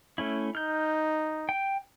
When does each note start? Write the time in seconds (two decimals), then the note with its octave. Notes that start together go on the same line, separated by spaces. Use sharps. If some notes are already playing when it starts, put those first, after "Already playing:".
0.18 A3 C#4 E4
0.55 D#4 F6 G6
1.49 G5